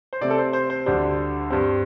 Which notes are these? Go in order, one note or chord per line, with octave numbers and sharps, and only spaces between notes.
C5
C3 A3 C4 D5
A4
C5
C5
C5
D2 D3 G3 D4 C5
G2 G3 C4